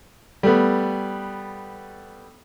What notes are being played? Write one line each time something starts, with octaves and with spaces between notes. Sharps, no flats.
G3 A3 B3